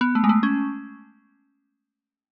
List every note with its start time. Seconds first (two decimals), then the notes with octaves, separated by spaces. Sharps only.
0.01 B3
0.15 A3
0.24 G#3
0.29 A3
0.43 C#4